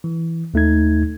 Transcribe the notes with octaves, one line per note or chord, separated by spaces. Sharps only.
E3
D#2 A3 D#4 G#6